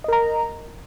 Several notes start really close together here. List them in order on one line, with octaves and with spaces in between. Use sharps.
D#5 A#4 A#5